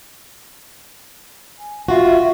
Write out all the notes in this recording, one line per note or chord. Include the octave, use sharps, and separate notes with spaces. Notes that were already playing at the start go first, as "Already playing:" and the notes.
G#5
F4 F#4 E5